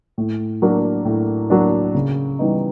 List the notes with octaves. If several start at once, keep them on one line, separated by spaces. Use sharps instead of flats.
A2
F#3 A#3 D4
A2
F#3 A#3 D4
C#3
E3 G3 B3 D#4